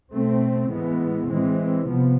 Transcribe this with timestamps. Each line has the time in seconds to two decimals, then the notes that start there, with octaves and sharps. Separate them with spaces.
0.12 B2 A3 C4
0.70 A2 E3 G#3 B3
1.29 E3 G#3 C4
1.87 C3 F3 B3